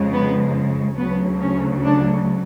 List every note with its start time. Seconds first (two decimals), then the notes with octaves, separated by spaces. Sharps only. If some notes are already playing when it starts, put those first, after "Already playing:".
Already playing: F2 C#3 G#3
0.12 B3
0.98 D2 C#3 F#3 B3
1.40 C#4
1.84 D4